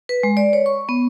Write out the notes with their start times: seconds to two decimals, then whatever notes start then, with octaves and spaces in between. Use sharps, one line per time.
0.09 B4
0.23 G#3
0.37 D5
0.53 C#5
0.66 C#6
0.89 B3